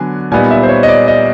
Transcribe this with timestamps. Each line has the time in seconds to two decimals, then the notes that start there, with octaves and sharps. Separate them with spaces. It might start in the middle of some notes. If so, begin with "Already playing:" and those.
Already playing: D3 F#3 B3 D4 G#5
0.31 A#2 G3 B3 D#4 G#5
0.51 E5
0.63 C5
0.69 C#5
0.83 D#5
0.88 D5
1.08 D#5